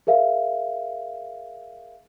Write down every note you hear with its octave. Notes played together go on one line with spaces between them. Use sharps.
G#4 A#4 E5 F5